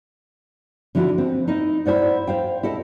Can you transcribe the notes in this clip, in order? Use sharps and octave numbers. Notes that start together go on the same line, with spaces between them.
D3 F3 D4 E4 F#4
C4
D#4 E4 A#4 D#5
E4 C5 D5 F#5
C5 F5 G5
E4 A4 D#5